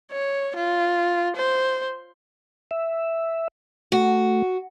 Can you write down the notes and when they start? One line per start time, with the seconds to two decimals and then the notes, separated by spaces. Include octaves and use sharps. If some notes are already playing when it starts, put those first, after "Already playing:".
0.12 C#5
0.56 F4
1.36 C5
2.71 E5
3.92 A3 F#4